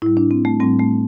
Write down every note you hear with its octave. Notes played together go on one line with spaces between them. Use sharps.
A2 G3 E4
D4
C4
A3
A2 G3 C4
A3